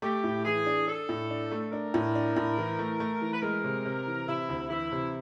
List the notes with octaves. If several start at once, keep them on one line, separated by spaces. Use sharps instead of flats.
A3 G4
A2
E3 G#4
D4
D4 A4
A2
D4
A3
D4 A#4
A2
D4
A2
E3
A3
A3
E3
B4
G#3 A#4
C3
C3
E3
C3 E4
D2
E3 E4
C3